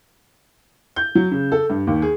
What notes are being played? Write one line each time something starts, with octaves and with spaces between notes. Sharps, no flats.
G6
F#3
C#3
A4
G2
D#2
G#4